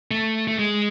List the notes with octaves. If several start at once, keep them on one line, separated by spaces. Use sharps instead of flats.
A3
A3
G#3